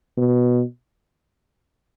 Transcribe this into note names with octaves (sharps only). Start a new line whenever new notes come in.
B2